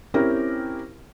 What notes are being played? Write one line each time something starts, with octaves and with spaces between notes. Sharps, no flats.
C4 C#4 E4 G4 A#4